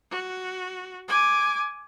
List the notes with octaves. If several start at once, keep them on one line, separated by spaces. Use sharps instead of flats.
F#4
G#5 D6